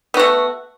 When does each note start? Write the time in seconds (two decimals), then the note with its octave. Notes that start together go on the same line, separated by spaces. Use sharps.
0.14 B3
0.17 F#4
0.19 A3